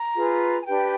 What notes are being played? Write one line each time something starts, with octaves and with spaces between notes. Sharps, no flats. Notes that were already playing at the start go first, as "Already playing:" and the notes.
Already playing: A#5
F4 G#4 B4
G#5
D4 G4 B4 G5